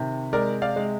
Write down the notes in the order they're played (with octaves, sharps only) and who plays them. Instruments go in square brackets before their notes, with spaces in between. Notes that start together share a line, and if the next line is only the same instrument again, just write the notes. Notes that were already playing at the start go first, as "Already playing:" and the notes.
Already playing: [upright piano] C3 D#3
[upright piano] G#3 [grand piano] A#4 D5
[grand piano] D5 F5
[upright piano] G#3